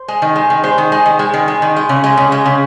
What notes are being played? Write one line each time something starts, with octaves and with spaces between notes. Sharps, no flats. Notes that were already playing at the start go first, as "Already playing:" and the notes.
Already playing: C5
G#3
D#3
G#3
D#3
G#3 C5
D#3
G#3
D#3
G#3
D#3
G#3
D#3
G#3
C#3
G#3
C#3
G#3
C#3